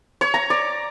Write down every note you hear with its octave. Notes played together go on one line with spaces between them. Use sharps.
C#5
A#5
D5